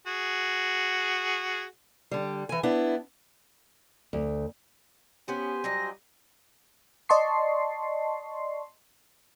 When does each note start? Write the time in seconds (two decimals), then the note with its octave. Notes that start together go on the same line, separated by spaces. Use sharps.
0.07 F#4 G#4
2.11 D3 G3
2.49 E3 G#5
2.63 B3 D4 E4
4.13 D2
5.28 B3 C#4 G4 C5 G#5
5.64 F#3 G3 D4 D#5 A#6
7.09 D5 D#5 A5 C6 C#6 C7